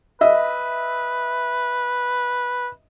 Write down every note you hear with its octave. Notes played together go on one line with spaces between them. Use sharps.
B4 D#5 E5